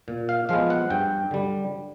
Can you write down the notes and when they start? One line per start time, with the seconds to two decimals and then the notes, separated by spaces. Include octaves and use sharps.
0.08 A#2
0.29 F5
0.49 F3 G#3 B3 F5
0.70 F#5
0.90 G2 G5
1.31 D3 G3